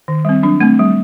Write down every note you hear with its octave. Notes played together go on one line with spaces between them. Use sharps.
D#3
G3 C4
F#3 D4
A3 C4
G3